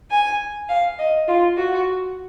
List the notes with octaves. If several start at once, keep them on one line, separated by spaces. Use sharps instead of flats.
G#5
F5
D#5
F4
F#4